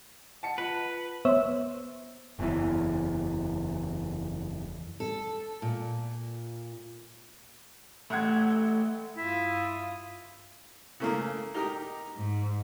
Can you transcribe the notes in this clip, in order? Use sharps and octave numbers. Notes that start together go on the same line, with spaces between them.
D#5 F#5 A5 C#7
F4 B4
B3 C5 C#5 E5 E6
F#1 E2 E3
A4
A#2
A1 A3 F#5 G#6
G2 E4 F4 D#6
C#3 A3 A#3
D#4 G4 A#4
G#2